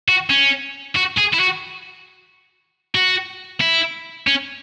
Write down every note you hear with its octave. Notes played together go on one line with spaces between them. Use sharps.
F#4
C#4
F#4
G#4
E4
F#4
F#4
E4
C#4